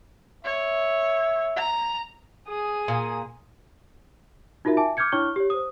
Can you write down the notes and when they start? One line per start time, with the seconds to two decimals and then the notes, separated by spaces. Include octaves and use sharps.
0.45 C#5 E5
1.56 A#5
2.48 G#4 D#6
2.88 A#2
4.65 D#4 F4 F#4 A#4 E5
4.77 E5 G#5 A5 D6
4.97 D6 F6 G6 G#6 C#7
5.12 D4 E4 C#5 C#6 F6 G7
5.36 G4 C#5
5.50 C5 D#6